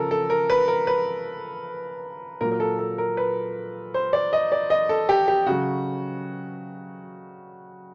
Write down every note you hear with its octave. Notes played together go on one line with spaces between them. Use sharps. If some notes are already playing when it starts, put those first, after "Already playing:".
Already playing: C#3 F3 A4 A#4
A4
A#4
B4
A#4
B4
A#2 F#3 A#4
A#4
A4
A4
A#4
B4
C5
D5
D#5
D5
D#5
A4
G4
G4
C#3 F#3 F#4